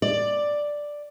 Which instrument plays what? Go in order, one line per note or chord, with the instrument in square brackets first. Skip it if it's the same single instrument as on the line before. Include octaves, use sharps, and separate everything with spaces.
[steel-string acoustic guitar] D5